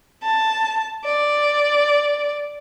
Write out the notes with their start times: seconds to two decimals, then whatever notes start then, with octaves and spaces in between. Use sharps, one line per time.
0.23 A5
1.05 D5